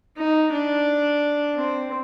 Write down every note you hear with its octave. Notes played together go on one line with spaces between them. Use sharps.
D#4
D4
C4